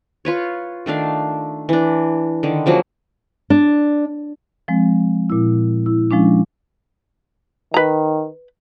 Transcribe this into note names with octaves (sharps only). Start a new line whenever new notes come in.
F4 B4 C#5
D#3 A3 D4 F5
E3 D4
D3 D#3
C#3 F3 F#3 A#3
D4
F3 G#3 C4
A#2 E4
E4
F3 G#3 C#4 D4
D#3 B4 A#5